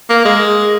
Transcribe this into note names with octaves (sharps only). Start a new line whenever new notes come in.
A#3
G#3